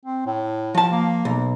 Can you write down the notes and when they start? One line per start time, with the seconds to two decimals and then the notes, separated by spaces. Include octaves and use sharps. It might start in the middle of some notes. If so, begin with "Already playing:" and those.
0.06 C4
0.26 A2
0.75 F3 A5
0.92 A#3
1.25 B1